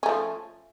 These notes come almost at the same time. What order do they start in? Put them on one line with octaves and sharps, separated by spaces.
C#4 A3 F3